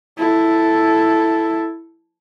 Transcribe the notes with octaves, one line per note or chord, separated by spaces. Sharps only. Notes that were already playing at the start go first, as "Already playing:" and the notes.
E4 A4